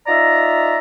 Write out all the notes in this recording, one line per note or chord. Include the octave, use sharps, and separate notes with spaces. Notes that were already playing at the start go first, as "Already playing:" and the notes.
D#4 F4 D5 E5 A#5